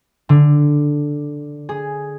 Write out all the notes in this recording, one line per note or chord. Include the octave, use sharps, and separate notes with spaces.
D3
G#4